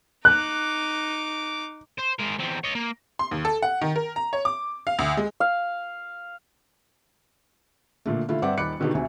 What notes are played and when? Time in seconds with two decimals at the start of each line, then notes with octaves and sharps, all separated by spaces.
0.25 D#4 D6 F#6
1.98 C5
2.19 G#3 A#4
2.39 E2 C4
2.64 C#5 D#5
2.75 A#3
3.19 C6
3.31 D#2
3.45 A4
3.62 F#5
3.81 D#3
3.96 A#4
4.16 A#5
4.33 C#5
4.45 D6
4.87 F5
4.99 D2
5.17 G#3
5.40 F5
8.06 A#2 D3 A3
8.29 D3 A3 E4 F4
8.42 G2 C4 D5 E5 F#5 D6
8.57 D#1 D#3 B5 D6 F#6 C#7
8.80 B2 D3 D#3 D#4 F#4 G4
8.94 D2 C3 G#5